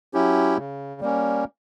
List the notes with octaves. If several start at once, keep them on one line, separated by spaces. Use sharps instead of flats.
F#3 C#4 E4 G4
C#3
G3 A#3 C#4